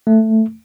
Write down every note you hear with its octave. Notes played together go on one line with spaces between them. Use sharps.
A3